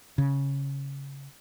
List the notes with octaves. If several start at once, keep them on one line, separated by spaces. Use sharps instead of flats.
C#3